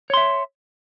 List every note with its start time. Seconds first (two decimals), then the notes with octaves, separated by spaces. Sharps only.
0.10 C#5
0.14 C6
0.17 E5